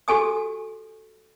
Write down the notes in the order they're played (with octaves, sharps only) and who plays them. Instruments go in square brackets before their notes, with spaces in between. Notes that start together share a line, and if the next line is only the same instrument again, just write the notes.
[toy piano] F#4 G4 A4 G#5 D#6